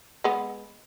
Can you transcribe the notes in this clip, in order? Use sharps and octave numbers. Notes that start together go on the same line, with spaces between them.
G#3 B3